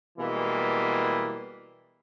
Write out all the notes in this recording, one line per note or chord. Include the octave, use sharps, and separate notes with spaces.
B2 E3 G3 G#3 A#3